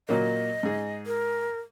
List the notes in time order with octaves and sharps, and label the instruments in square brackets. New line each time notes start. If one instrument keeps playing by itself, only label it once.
[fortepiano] A#2 F#3 A#3 [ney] D#5
[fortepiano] G#2 G#4
[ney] A#4